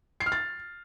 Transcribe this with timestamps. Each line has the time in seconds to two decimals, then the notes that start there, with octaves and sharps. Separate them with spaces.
0.20 C7
0.26 F6
0.32 A6